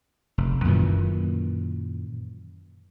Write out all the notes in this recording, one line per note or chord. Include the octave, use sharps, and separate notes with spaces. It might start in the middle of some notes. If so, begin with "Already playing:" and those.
F1
F#2 A#2 D#3 E3